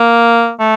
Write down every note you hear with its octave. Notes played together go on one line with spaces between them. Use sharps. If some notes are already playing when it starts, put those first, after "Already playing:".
Already playing: A#3
A3